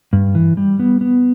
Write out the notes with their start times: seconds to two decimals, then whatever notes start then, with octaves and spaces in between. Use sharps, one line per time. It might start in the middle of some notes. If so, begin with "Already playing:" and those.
0.13 G2
0.35 E3
0.57 G3
0.79 B3
1.01 B3